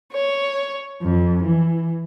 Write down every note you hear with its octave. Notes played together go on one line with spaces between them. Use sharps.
C#5
F2
E3